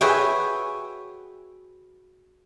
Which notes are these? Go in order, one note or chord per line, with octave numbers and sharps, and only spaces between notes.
F#4 G#4 B4 C#5 E5 G5